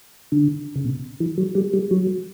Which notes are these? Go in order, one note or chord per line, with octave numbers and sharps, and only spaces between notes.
D3
C#3
B2
E3
F#3
G3
G3
F#3